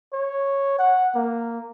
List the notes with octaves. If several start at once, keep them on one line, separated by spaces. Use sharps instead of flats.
C#5
F#5
A#3